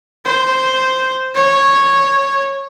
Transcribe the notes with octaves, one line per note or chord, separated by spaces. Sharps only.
C5
C#5